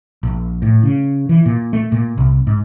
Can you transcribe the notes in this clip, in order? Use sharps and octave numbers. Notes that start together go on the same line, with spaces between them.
A#1
A2
C#3
E3
A#2
A3
A#2
C2
G#2